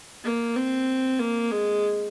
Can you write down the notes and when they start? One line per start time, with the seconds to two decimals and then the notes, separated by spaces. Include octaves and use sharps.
0.24 A#3
0.56 C4
1.19 A#3
1.51 G#3